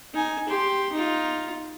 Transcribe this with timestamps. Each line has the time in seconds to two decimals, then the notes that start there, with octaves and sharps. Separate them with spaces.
0.14 D#4 G#5
0.49 G4 C6
0.93 D#4 F4